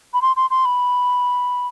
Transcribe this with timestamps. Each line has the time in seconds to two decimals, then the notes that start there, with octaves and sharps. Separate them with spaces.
0.14 B5
0.22 C6
0.36 C6
0.50 C6
0.65 B5